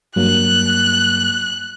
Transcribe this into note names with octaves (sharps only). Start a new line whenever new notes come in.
G2 F#3 A#3 F#6